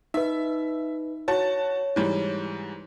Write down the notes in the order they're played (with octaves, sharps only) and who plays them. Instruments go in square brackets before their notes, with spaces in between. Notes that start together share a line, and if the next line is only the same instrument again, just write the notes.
[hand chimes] D#4 B4 [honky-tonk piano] E5
[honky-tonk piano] F#4 A5 A6 [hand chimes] C#5
[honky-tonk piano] G#2 E3 G3